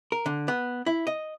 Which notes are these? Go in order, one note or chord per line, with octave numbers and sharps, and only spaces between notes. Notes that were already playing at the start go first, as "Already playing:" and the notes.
A#4
D3
B3
E4
D#5